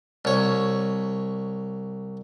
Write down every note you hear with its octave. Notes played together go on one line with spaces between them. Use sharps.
C2 C#5